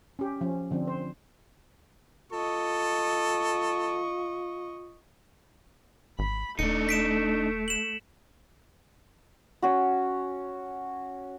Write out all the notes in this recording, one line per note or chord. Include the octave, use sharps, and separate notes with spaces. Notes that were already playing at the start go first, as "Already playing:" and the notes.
C#4 G4
F3 C#4
D3 F3 C4 D4
C5
F4 A4 D#5 C#6
G#1 B5
D#1 A3 D4 D#4 C#7
B6 D7 E7
E7 F#7
C#4 F#4